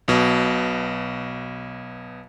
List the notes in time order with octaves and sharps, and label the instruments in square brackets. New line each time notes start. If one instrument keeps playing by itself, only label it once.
[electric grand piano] B1 B2